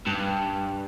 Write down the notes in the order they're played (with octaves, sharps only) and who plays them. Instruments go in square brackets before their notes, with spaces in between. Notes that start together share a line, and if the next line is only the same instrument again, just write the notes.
[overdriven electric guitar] G2